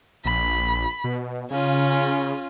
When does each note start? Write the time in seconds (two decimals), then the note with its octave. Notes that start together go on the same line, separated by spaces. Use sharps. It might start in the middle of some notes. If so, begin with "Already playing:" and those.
0.25 A#1 B5
1.04 B2
1.51 C#3 C#4 F4